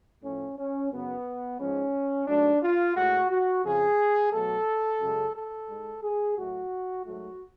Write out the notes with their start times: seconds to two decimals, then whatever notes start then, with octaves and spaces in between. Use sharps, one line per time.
0.23 A2 F3 A3 C#4
0.58 C#4
0.91 F#2 C#3 F#3 B3
1.59 G#2 F3 G#3 C#4
2.27 G#2 F#3 A3 D4
2.62 F4
2.96 A2 G#3 F#4
3.30 F#4
3.64 F2 C#3 F3 G#4
4.32 B2 F#3 A3 A4
5.01 F#2 C#3 G#3
5.35 A4
5.69 G#2 G#3
6.03 G#4
6.37 A2 F#3 A3 F#4
7.06 G#2 F#3 A3 F#4